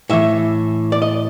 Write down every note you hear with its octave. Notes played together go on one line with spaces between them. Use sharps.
A2 E3 E5
D5
D#5